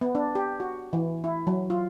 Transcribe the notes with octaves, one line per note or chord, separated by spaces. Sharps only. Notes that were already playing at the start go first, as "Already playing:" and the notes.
B3
D4
G4
F#4
E3
E4
F#3
F4